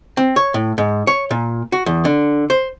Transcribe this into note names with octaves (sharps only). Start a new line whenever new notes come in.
C4
C#5
A2
G#2
C#5
A#2
F#4
E2
D3
C5